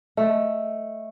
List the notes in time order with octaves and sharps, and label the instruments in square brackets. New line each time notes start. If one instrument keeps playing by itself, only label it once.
[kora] A3 [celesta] D#5